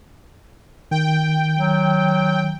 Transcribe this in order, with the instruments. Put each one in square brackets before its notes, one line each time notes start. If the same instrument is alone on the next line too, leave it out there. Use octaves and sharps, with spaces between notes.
[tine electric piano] D#3 [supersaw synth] G5
[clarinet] F#3